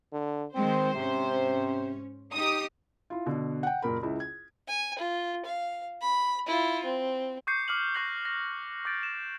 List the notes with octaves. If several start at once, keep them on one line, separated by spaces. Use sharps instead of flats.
D3
D#3 G#3 C4 C5
G#2 C3 C#4
D#4 G4 D#6
E4 F4
B2 D3
F#5 G5
F#1 A#2 A#4 B5
C#2 E4
G#6
G#5
F4
F5
B5
E4 F4
C4
C#6 D6 G6 C7 C#7
D6 F6 F#6 F#7
C#6 F#6 G6 A#6 C7 F#7
A#6
D6 G6 A6 D7
E7